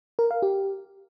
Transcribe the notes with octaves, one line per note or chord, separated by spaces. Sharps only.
A#4
F5
G4